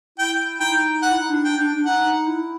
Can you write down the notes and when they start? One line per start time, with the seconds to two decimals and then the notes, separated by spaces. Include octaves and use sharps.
0.18 E4 G5
0.60 D#4 G5
1.02 F#5
1.10 E4
1.20 D#4
1.30 D4
1.44 G5
1.57 D4
1.75 D4
1.86 D#4 F#5
2.27 E4